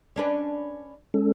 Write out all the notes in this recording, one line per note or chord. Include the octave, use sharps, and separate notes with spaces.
C#4 D4 B4
G#3 C#4 A4